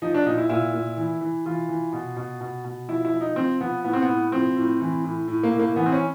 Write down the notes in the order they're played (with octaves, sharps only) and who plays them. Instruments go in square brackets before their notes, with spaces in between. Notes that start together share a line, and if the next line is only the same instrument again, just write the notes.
[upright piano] F3 D#4
D4
A#2 D#4
E4
A#2 E4
A#2
E3
E3
E3 F4
E3
B2
B2
B2
B2
F3 E4
E4
F3
D#4
F3 C4
F3 B3
A2 B3
C4
B3
A2
F3 C4
A2
E3
A2
A2
A#3
A2
A#3
E3 B3
C4
C#4